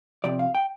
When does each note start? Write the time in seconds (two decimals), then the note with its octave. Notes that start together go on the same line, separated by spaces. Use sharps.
0.24 F2 C3 F3 D5
0.39 F5
0.55 G5